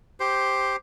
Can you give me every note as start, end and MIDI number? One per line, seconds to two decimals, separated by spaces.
0.20 0.76 67
0.20 0.76 72